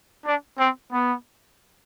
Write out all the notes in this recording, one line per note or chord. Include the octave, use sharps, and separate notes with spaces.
D4
C4
B3